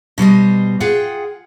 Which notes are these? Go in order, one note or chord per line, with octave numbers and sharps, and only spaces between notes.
B2 G3 C5 D#5
F4 G#4 F#5 G5